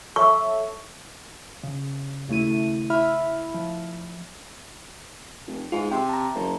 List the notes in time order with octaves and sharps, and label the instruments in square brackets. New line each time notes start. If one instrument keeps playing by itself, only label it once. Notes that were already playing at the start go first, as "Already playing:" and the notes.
[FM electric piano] A4 C#5 E5 [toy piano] C#6
[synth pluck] C#3
D#2 C#3 A3 E4 D#7
E4 E5 B5 F6
F3
[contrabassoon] F1
[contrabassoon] G#2 [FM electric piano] F4
[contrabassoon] C3 [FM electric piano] G5 C6
[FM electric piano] A5 A#5
[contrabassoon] F#1